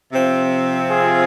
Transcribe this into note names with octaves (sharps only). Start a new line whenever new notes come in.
C3 F3 C4
F4 G#4